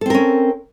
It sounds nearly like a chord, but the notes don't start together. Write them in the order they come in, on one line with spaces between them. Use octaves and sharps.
A4 C4 A#4 C#4